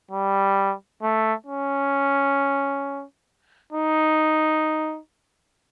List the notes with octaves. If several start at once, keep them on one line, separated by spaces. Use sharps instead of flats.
G3
A3
C#4
D#4